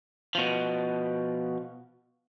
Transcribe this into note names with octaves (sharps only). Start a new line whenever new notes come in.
B2 F3